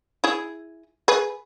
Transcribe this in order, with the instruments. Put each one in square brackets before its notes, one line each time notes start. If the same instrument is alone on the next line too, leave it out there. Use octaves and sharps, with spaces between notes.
[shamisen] E4 G#4
G#4 B4